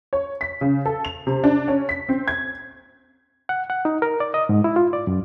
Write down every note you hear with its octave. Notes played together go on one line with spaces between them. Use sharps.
C#5
B6
C#3
A4
F7
C3
D4
C#4
B6
C4
G#6
F#5
F#5
D#4
A#4
D5
D#5
G#2
E4
F4
D5
F#2